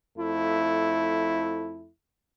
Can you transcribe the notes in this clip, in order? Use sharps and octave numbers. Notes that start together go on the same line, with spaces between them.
F2 A3 E4